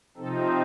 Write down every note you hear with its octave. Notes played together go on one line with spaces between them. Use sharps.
C3 F3 C4 D#4 A4